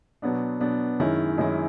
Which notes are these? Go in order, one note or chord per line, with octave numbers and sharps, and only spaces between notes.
B2 F#3 B3 D4
B2 F#3 B3 D4
F#2 D#3 G#3 C#4 E4
F#2 D#3 G#3 C#4 E4